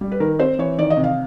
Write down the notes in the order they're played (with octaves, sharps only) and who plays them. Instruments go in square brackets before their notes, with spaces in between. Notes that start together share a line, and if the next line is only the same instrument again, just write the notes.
[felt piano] G3
B4
D#3 A#4
C4 C5
E3 C#5
D#3 D5
D#5
C3
F5